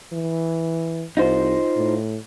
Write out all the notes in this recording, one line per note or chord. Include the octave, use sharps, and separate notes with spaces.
E3
C2 D#4 F4 C5
A2